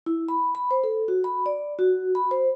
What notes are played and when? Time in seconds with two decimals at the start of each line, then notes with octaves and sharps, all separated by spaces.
0.06 E4
0.28 B5
0.55 B5
0.71 C5
0.84 A4
1.08 F#4
1.24 B5
1.46 D5
1.79 F#4
2.15 B5
2.31 C5